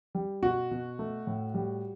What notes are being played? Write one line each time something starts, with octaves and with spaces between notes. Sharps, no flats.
G3
B2 F#4
B2
A3
A2
G3